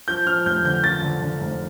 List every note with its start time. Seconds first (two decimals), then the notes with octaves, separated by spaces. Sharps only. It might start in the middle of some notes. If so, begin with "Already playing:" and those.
0.08 F3 G6
0.26 F3 F6
0.46 F1 G6
0.65 D3 G6
0.84 F3 A6
1.03 D3
1.22 D3
1.41 F1